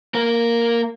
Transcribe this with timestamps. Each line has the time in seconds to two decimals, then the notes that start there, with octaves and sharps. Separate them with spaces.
0.14 A#3 A#4